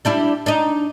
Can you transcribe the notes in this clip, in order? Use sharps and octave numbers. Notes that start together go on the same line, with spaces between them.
G3 D4 E4
D4 D#4